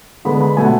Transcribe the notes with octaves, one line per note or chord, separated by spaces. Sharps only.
D3 G#3 B3 B5
B5
B2 F#3 A3 G#5
F#5